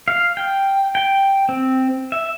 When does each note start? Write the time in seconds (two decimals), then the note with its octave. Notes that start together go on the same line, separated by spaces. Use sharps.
0.08 F5
0.37 G5
0.95 G5
1.49 C4
2.12 E5